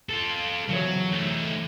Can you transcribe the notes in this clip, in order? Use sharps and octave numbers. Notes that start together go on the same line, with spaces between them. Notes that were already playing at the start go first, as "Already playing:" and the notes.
F4 A4
C#3 E3 F#3 C#5
A3 D#4